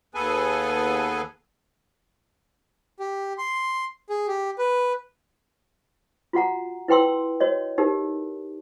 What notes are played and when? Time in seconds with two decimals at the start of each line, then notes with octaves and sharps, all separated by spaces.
0.15 D#2 B3 G#4 A4 B4 G#5
3.00 G4
3.38 C6
4.10 G#4
4.28 G4
4.59 B4
6.33 F4 F#4 F#5 A#5
6.88 E4 B4 G5 C6 E6
7.40 F#4 C#5 D#5
7.78 D#4 G4 A#4